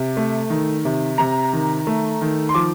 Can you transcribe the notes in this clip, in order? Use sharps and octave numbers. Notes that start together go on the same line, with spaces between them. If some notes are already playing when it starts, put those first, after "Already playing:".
Already playing: C3
A3
D#3
C3
C3 A#5
D#3
A3
D#3
C6
F3 D6